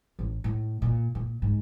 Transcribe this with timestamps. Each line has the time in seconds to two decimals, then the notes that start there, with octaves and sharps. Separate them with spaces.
0.19 A1
0.44 A2
0.82 A#2
1.15 A#2
1.42 G#2